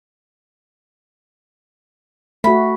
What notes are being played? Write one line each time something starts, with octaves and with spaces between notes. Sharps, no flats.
A3 F#4 B5